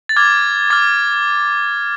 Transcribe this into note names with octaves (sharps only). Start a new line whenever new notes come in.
A6
D6 F6 G#6
D6 F6 A6